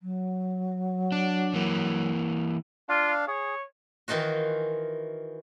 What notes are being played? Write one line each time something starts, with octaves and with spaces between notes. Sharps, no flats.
F#3
D4
E3 A#3
D4 F4 F5
G#4 C#5
D#3 E3 D#4 F4 F#4